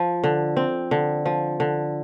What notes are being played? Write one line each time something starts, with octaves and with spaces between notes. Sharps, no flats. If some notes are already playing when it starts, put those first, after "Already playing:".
Already playing: F3
D3
C4
D3
F3
D3